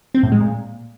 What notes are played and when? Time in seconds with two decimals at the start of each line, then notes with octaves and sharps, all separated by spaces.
0.15 C4
0.23 A2
0.32 G#3
0.41 A#2